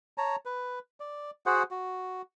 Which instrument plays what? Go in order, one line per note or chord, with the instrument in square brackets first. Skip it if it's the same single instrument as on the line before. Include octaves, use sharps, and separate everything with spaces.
[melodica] C#5 A5 A#5
B4
D5
F#4 G#4 C5 F#5
F#4